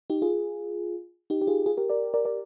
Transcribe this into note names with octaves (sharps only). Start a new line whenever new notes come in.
D#4 G4
F4 G#4
D#4 G4
G4
F4 G#4
F4 G#4
G4 A#4
A#4 D5
A#4 D5
A#4 D5